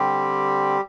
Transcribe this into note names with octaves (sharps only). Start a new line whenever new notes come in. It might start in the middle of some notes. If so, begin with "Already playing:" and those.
Already playing: D3 G3 C4 G4